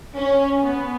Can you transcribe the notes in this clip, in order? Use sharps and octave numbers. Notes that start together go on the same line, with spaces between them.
C#4
B3